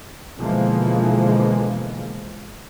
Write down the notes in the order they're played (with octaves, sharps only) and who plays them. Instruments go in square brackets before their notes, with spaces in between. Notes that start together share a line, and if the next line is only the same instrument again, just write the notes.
[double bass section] B2 D3 E3 F3 G#3 A#3